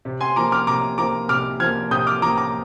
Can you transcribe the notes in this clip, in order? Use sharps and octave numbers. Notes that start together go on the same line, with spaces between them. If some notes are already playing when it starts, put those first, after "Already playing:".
C3
G#5 C6
F3 A#3 A#5 D6
D6 F6
C3 A#5 D6
F3 A#3 A#5 D6
C3 D6 F6
F3 A#3 F6 G#6
C3 D#6 G6
D6 F6
F3 A#3 A#5 D6
A#5 D6